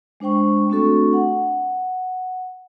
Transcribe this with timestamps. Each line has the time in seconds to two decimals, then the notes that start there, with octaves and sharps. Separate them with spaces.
0.20 G#3 D4 C5 G5 C#6
0.70 A3 C4 D4 F#4 A4 C#6
1.13 F#5